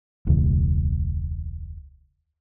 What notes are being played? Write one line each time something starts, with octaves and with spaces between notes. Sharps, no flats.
E1 C#2 E3